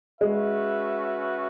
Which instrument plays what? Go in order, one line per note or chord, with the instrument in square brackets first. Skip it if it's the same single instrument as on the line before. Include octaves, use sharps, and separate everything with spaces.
[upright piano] G#3 [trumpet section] C#4 F#4 B4 E5